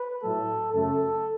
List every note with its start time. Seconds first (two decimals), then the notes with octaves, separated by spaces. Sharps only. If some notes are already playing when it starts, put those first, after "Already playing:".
Already playing: B4
0.21 A2 F#3 A3 A4
0.72 F#2 C#3 A3 A4